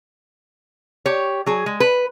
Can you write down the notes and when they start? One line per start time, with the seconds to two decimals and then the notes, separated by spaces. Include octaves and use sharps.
1.06 G4 C#5
1.46 F#3 G#4
1.66 G#3
1.80 B4